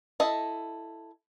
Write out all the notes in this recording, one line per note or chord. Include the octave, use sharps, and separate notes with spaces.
E4 A4 D#5